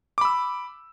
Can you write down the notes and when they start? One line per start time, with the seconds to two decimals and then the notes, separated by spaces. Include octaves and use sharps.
0.18 D6
0.21 B5
0.25 E6